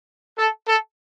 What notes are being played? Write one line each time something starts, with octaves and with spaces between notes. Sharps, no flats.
A4
A4